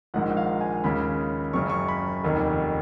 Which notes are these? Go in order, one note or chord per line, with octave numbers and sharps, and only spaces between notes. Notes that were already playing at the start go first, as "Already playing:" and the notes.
A#1 G#2 D#3 G#3 F#5
F5
G#5
D#2 C#3 G#3 B5
F#1 F#2 C#3 C#6
C#6
B5
F1 D#2 D#3